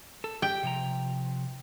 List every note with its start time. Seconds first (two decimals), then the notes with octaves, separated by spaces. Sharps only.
0.24 A4
0.42 G4 G5
0.63 C3 F3 A#5